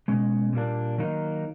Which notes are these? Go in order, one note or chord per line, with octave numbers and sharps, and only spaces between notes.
B2 G#3 C#4
A#2 G3 A#3 D4
D#3 F#3 A#3 D#4